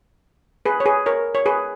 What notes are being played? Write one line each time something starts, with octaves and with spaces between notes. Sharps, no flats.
G#4 B4
C#5
G#4 B4
A#4 C#5
C#5
G#4 B4